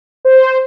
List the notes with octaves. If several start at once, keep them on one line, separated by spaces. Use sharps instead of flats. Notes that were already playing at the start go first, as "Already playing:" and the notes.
C5